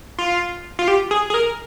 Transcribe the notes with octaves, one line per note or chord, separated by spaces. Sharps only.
F4
F4
G4
G#4
G#4
A#4